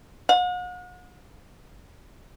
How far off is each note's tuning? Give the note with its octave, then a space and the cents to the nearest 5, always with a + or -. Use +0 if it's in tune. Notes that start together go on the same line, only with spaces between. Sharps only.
F#5 -45